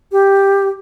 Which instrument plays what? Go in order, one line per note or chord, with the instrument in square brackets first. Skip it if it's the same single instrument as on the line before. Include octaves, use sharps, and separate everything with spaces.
[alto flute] G4